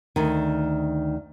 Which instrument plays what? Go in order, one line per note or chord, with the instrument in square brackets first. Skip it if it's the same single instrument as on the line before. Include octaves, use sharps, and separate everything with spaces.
[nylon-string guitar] D2 D#3